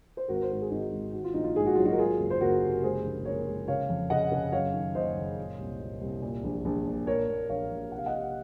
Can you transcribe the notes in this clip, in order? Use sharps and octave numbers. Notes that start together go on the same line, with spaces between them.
C5
G#1 F#4 A#4
C5
G#2 A#4
G#4
G#1 D#4 F#4
G#1
D#3 F#4
F4
A#1 D#4
F4
G#2 G#4
F#4
F#3 F4
D#4 F#4
A#4
F#3 F4 G#4
F#1
C5
F#1 F#4 A#4
C3
G#3 G#4 C5
A#1
F3 A#4 C#5
G#3
C#3 C#5 F5
F2
C#3 D#5 F#5
C#3
F#2 C#5 F5
D#3
F#1 C5 D#5
F#1
A#2
C2
A#2
C2
A#2
A#1
A#1
A#2
A#2 A#4 C#5
A#2
A#1 C#5 F5
A#1
C3 F#5
F5
D#5 F#5
C3